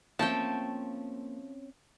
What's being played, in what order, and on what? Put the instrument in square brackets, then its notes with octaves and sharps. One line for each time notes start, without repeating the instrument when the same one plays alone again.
[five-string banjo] F3 A3 [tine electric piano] A#3 [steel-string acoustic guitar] C4 C#4 C#5 [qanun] G5 A5